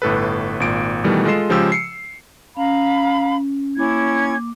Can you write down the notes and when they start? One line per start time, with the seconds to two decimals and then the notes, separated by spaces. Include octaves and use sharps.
0.02 G1 A2 A4 B4
0.60 G#1 A#2 D7
1.04 B2 D#3 E3 G3 A3
1.25 G#3 F4 A4 D#5 C7 E7
1.50 C#3 F3 G#3 G4 E6
1.72 C7 C#7
2.57 C#4 F5 A#5 B5
3.77 A#3 C#4 E4 D6 G#6